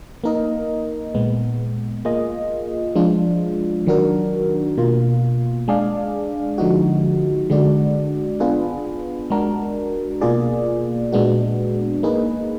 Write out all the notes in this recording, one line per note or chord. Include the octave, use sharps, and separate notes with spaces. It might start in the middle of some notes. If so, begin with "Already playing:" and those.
A#3 D#4 A#4 D#5
A#2 G#3 B3
A#3 F4 G#4 D#5
F3 G#3 D4 F4
D#3 F#3 D4 F#4 A#4
B2 A#3 F4
G#3 D4 G#4 D5 F5
D3 F3 G#3 D#4 F#4
D3 G#3 D4 F#4 D5
B3 D4 F4 G#4 B4
G#3 D4 F#4 A#4
B2 A#3 F4 G#4 D5
A#2 G#3 B3 D4 F#4
A#3 D#4 G#4 B4